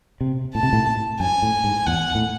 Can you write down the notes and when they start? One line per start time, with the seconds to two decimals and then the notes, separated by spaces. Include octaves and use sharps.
0.21 C3
0.54 A2 A5
0.63 C3
0.73 A2
1.20 F#2 G#5
1.42 A2
1.64 G#2
1.86 E2 F#5
2.15 A2